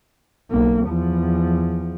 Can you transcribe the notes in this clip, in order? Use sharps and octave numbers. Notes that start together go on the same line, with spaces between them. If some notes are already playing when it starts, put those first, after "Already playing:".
B1 A#3
E2 F3